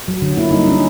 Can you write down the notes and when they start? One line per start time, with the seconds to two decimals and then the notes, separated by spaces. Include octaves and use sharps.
0.08 F#3
0.22 D3
0.37 A#3 E4
0.51 G3 D#4
0.66 C#4 D4